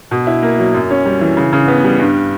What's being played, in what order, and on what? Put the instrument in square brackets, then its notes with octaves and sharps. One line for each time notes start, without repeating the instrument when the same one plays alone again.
[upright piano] B2
E4
A#3
F#3
F#2
C#4
G3
E3
C#3
C#3
B3
G3
G2